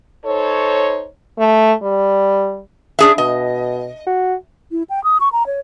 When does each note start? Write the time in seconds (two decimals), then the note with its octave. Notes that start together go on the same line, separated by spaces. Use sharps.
0.24 D#4 A4 C5 C#5
1.39 A3
1.83 G3
2.99 D4 G#4 E5
3.18 B2 D#5
4.07 F#4
4.71 E4
4.90 G5
5.04 D#6
5.20 C#6
5.32 A#5
5.46 C#5